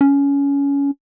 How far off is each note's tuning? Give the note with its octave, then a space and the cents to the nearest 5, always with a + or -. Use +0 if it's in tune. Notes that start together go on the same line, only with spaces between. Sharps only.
C#4 +20